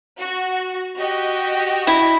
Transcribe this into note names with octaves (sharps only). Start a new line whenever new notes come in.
F#4
F#4 G4 D#5
E4